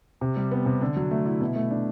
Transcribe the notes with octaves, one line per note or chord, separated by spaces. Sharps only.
C3
G3
B3
C3
D3
F#3
A3
E4
B2
A3
D4